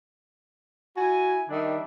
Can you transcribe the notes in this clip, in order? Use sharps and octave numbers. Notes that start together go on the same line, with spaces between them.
E4 F#4 G#5
D#3 G3 D4 E5